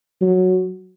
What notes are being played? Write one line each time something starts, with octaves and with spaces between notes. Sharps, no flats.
F#3